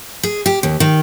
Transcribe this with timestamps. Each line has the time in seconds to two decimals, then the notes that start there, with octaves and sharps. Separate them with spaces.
0.23 G#4
0.46 G4
0.63 D#2
0.80 D#3